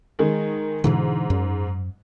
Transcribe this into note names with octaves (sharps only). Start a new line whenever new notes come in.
D#3 G#3
G#2 B2 D3 E3
F#2